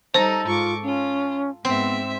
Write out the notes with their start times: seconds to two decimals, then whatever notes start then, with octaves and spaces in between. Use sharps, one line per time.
0.14 G3 D#4 A4 C5 A#5
0.46 G#2 F4 C#6 D6
0.83 C#4 F4
1.65 G#2 B3 C4 E5